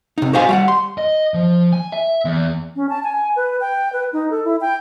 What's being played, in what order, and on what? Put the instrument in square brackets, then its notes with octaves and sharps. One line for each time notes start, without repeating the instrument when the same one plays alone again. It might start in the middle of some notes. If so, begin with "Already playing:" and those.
[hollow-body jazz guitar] C3 D#4
F#4 G4 C5 D#5 F5 G#5
G3 F5 F#5
C6
[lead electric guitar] D#5
F3
G#5
E5
E2
[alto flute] C#4
A5
G#5
B4
G5
B4
D#4
A4
E4
G5